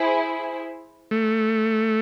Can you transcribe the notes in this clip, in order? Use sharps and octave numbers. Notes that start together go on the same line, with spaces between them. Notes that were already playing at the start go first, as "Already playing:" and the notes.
Already playing: E4 G#4 C5
A3